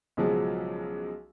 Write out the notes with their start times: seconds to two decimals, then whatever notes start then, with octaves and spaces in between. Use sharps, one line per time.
0.17 B1 C#3 F3 F#3 G#3